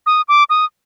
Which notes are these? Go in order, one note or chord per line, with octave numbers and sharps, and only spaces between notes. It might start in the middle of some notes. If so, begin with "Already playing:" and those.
D#6
D6
D#6